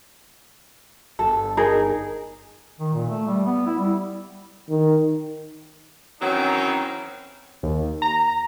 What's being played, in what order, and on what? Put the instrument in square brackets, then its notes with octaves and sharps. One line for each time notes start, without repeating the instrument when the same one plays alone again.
[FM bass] G1 [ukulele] A4
[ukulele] D#4 G#4 A#4
[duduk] D#3
A#2
A3
G3
B3
E4
G3
[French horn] D#3
[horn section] D#3 E3 F#3 C4 C#4 D#4
[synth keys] D#2
A#5